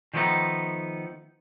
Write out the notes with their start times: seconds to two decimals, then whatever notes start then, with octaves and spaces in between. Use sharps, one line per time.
0.14 D#3 F3 A3 B3 D#4